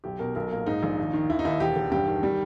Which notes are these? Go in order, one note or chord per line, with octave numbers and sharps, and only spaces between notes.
B1 G4
B2 A#4
B1 A#4
A#2 A#4
G#2 D#4
A#1
D#2
D#3
D#2 E4
D#4
D#2 E4
E1 G4
E1
G2 G4
D#3
G3